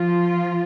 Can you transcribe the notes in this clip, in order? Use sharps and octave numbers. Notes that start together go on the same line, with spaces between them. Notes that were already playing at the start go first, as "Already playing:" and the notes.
Already playing: F3 F4